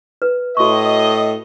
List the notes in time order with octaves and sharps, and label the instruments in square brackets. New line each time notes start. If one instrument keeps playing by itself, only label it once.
[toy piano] B4
[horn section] A2 D#5 [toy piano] F#4 C#6